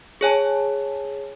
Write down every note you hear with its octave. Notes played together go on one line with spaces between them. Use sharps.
G#4 C#5 G#5 A5